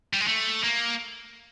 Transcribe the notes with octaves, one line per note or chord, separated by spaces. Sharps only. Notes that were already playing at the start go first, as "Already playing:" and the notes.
G3
G#3
A3
A#3